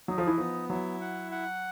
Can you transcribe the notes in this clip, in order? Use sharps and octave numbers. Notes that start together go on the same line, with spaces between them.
F#3 D#4
F3
E3
F3 B3
F#3 E4
F#5
F#5